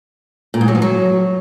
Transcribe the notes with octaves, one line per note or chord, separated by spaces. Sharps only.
A#2
G#2
F#3
F3
F#3